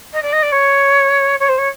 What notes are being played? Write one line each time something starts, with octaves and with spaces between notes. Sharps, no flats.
D#5
D5
D#5
D5
C#5
C#5
C5
C#5